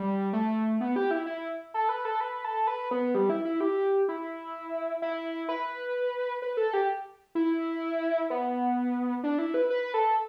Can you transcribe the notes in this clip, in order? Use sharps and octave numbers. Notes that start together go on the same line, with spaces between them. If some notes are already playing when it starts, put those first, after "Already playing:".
Already playing: G3
A3
B3
G4
E4
E4
A4
B4
A4
B4
A4
B4
B3
G3
E4
E4
G4
E4
E4
B4
B4
A4
G4
E4
B3
D4
E4
B4
B4
A4